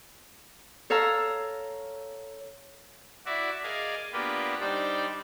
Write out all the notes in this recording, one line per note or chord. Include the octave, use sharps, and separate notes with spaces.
A4 C#5 F5 A#5 E6
E4 F#4 D5 E5
G#4 A#4 D5 D#5 F5 G#5
A#3 B3 D4 F4 G4 B4
G3 D4 D#4 C5 D5 G5